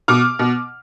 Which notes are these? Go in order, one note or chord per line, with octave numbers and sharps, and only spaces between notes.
B2 D6 F6
B2